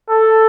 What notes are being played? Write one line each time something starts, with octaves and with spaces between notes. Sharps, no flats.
A4